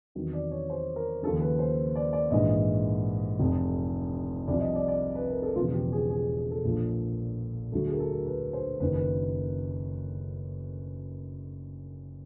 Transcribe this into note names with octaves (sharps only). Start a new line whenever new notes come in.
E2 C3 D#3 F#3
D5
C#5
C5
A#4
D#2 C#3 F3 A4
B4
C5
D5
D5
A#1 G#2 E3 D#5
F1 F2 C3
C2 C3 F3 D5
D#5
D5
D5
B4
A#4
A4
E1 E2 C#3 F3 F4
G4
G#4
G#4
G#4
A4
A#1 A#2 F3
D2 D3 F#3 A4
G#4
A#4
A4
A#4
B4
C5
F#1 F#2 D#3 B4
B4